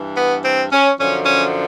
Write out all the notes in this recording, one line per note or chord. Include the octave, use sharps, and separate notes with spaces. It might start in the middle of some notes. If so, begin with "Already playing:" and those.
Already playing: G2 E3
B3
C4
C#4
F#2 D3 F3 C#4
C#4